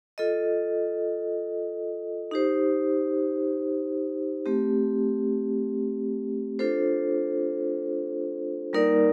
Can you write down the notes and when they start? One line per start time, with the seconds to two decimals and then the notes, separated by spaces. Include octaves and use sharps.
0.18 F4 A4 D#5
2.31 D#4 G4 C5
4.46 A3 C4 G4
6.59 D4 F4 A4 C5
8.73 G3 A#3 D#4 A#4 D5